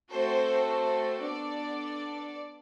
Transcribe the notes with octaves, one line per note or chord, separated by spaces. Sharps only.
A3 C4 F#4 A4 C5
C5
B3 D4 A4 D5